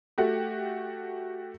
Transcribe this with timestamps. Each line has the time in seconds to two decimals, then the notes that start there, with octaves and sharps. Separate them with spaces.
0.18 A3 F#4 G4